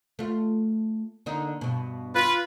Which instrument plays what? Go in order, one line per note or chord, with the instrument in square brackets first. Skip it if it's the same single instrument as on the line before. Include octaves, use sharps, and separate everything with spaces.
[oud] A3 F4
D3 A#3 D#4
G2 B2
[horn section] F4 B4